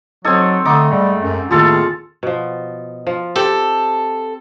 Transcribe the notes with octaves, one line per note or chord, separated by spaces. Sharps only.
F#3 C4 D#4 A4 D#6 G#6
D3 A3 D#4 D6 D#6
G#2 G3
F#2
D#2 A2 D#3 F4 G#4 A4 A5
B2 F3
F3
C4 G4 A4